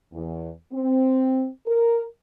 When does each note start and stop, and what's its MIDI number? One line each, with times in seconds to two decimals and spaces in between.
0.13 0.49 40
0.73 1.49 60
1.67 2.02 70